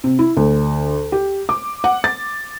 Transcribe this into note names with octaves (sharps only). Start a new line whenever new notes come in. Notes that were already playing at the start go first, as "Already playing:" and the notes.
C3
E4
D2
G4
D6
F#5
A6